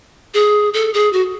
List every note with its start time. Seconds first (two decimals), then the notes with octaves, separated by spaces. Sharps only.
0.34 G#4
0.74 A4
0.94 G#4
1.13 F#4